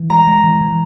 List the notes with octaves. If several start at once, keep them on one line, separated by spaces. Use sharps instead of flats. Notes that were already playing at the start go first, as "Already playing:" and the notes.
Already playing: E3
G#3 A#5
G#3
E3
E3